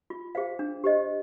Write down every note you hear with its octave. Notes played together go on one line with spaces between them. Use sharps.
F4
G#4 C5 F5
D4
G4 C5 D#5